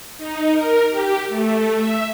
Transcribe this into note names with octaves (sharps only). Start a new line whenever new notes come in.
D#4
A#4
G4
A3
E5